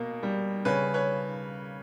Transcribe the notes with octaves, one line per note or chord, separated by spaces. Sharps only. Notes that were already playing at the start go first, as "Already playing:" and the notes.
Already playing: B2 A#3
G3
C#3 B4 C#5
B4 C#5